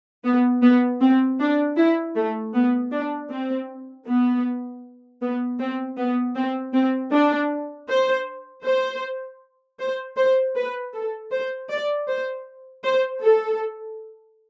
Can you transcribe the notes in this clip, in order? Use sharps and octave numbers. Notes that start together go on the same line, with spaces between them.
B3
B3
C4
D4
E4
A3
B3
D4
C4
B3
B3
C4
B3
C4
C4
D4
C5
C5
C5
C5
B4
A4
C5
D5
C5
C5
A4